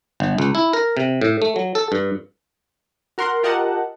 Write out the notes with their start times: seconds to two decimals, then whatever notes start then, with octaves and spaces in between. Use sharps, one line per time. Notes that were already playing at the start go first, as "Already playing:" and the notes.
0.20 G1
0.38 C#2
0.55 E4
0.73 A#4
0.97 C3
1.21 A2
1.42 A3
1.56 F#3
1.75 A4
1.92 G2
3.18 F#4 A#4 F#5 C6
3.43 F4 G4 A#4 D#5 F#5 A5